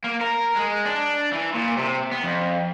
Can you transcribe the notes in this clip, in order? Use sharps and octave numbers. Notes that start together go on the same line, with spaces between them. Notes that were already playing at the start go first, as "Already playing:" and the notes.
A#3
A#4
G#3
D4
E3
A#2
C3
B3
F2